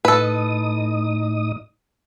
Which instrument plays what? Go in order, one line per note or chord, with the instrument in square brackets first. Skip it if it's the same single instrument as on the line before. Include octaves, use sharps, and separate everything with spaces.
[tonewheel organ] A2 D#4 D#6 [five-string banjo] A4 B4